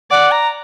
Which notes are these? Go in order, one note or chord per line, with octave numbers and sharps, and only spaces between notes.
D5 F#5
A#5